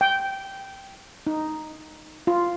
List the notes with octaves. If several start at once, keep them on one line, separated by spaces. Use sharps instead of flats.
G5
D#4
F4